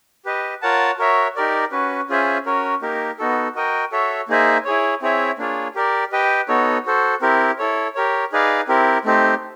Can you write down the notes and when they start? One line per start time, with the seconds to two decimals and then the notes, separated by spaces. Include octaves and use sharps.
0.25 G4 B4 D#5
0.62 F4 A#4 C#5 F#5 A5
0.98 F#4 A#4 C#5 E5
1.36 D#4 G4 A#4 D5
1.72 C#4 F#4 B4
2.09 C#4 F4 G#4 C5 E5
2.46 C#4 F#4 A#4 C#5
2.81 A#3 D#4 G4 A#4
3.19 B3 D#4 F#4 A4
3.55 F#4 A#4 D#5 G5
3.92 F#4 A4 C#5 E5
4.29 A#3 D#4 G#4 C5 E5
4.65 E4 G#4 C#5
5.02 C4 E4 G#4 C#5 E5
5.38 A#3 D4 F4 G#4 C#5
5.75 G4 A#4 D5
6.12 G4 B4 D#5 G5
6.48 B3 D#4 F#4 A4 C#5
6.86 F#4 A4 C5
7.22 C4 E4 G4 A#4
7.59 E4 A4 C#5
7.95 G4 A#4 C#5
8.32 D#4 G#4 B4 D5 F5
8.68 C4 E4 G4 A#4
9.05 A3 C4 D#4 G4 C5